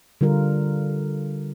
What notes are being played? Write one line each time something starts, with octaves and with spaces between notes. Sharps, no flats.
D3 G3 F4 A#4